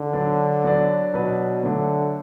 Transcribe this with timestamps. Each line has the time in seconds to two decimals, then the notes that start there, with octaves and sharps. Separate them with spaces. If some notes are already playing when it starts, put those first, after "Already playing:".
Already playing: D3
0.13 F#3 D4 B4 D5
0.64 F#3 D4 B4 D5
1.14 B2 F#3 D4 B4 D5
1.64 D3 F#3 A3 D4